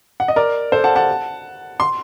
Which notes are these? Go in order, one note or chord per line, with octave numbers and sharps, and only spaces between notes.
F#5
D#5
A#4 D5
A4 C5
F#5 A5
F#5 A5
C6